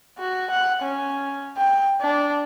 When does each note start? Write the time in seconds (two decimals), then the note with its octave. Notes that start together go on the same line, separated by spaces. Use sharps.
0.18 F#4
0.50 F#5
0.82 C#4
1.57 G5
2.01 D4